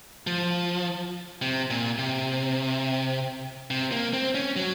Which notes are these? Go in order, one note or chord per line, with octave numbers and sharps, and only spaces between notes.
F3
C3
A#2
C3
C3
A#3
C4
C#4
F#3